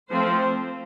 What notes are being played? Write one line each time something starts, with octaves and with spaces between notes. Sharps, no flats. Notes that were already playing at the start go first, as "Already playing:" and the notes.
F3 A3 C4 C5